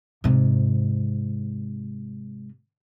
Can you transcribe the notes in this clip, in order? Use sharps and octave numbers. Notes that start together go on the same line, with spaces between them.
G#2 C3